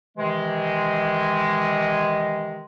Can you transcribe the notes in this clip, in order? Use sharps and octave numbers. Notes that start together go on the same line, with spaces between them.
C3 D#3 E3 G#3